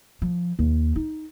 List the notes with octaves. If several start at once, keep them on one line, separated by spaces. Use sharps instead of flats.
F3
D#2
D#4